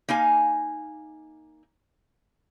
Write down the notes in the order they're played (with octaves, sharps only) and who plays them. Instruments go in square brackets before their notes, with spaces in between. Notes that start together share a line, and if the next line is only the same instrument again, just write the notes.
[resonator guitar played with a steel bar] A#3 D#4 F5 G#5